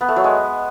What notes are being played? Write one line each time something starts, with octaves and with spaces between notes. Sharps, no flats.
B3
A3
F#3
G#3